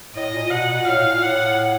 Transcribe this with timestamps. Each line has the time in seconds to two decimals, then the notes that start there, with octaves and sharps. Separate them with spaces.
0.15 A2 D#5
0.33 A#2
0.51 B2 F#5
0.69 A#2
0.87 A2 F5
1.04 A#2
1.22 A2 F#5